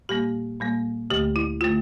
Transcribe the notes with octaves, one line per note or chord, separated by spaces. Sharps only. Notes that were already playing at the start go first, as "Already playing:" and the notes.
A#2 G3 A#3 G4
A#2 G3 A#3
D2 D3 A3 G4
E4
D3 A3 F4